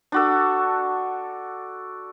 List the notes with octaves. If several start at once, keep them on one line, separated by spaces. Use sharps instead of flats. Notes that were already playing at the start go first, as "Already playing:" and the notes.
D4 F#4 A4